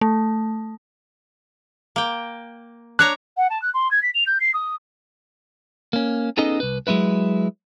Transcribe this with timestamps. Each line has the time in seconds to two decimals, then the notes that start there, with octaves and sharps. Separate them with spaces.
0.01 A3
1.96 A#3 G5
2.99 D4 C#5 A#5 F#6
3.37 F#5
3.49 A5
3.61 F#6
3.74 C6
3.90 G#6
4.02 B6
4.14 F7
4.26 G6
4.40 C7
4.53 D#6
5.93 A#3 C#4
6.37 B3 C#4 D#4 G#4 A4 D#5
6.60 C2 B4
6.87 F#3 G#3 C#4 E4 B4